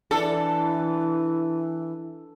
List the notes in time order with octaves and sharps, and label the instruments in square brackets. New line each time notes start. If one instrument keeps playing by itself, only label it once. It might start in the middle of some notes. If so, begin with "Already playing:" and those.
[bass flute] E3 [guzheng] D4 [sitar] A4